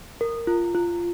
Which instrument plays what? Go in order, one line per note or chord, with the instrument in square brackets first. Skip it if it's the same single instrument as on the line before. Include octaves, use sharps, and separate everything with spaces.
[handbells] A#4
F4
F4